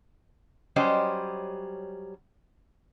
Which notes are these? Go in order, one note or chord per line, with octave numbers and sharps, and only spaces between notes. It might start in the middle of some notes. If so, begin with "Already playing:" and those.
F#3 G3 C#4 G4 C5 D#5